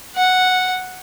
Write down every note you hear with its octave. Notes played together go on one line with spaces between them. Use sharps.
F#5